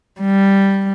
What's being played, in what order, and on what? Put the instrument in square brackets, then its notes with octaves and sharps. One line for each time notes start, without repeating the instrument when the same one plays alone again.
[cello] G3